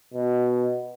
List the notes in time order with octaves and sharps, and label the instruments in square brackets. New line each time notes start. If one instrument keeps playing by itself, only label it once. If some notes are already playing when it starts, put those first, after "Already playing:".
[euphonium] B2